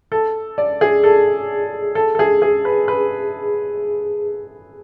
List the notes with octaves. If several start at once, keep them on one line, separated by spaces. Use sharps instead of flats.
A4
D5
G#4
A4
A4
A4
G#4
G#4
B4
B4